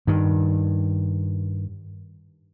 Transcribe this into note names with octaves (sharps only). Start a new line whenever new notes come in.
G2 D#3